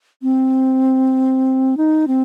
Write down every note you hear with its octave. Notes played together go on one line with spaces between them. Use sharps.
C4
D#4
C4